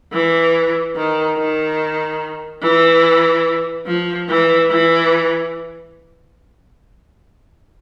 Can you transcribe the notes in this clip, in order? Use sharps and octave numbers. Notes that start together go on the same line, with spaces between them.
E3
D#3
D#3
E3
F3
E3
E3